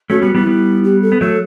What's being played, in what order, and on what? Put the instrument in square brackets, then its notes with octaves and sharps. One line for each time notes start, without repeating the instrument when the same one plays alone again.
[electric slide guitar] A3 C#4 [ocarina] F#4
[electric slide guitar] G3 B3 [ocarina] F#4
[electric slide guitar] G3 B3 [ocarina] E4
[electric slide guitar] G3 B3
[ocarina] G4
A4
[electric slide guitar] B3
[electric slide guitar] F#3 A3 [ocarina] A4